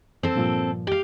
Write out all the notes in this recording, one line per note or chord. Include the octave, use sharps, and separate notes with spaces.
C4 A4
G2 A#2 F3
G4 F5